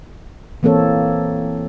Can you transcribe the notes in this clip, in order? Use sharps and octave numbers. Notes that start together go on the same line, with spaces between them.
E3 A#3 C4 A4 C#5